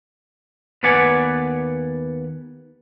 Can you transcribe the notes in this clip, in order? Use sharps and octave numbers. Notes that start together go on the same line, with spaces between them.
D#2 B3 B4 D5 F#5 G#5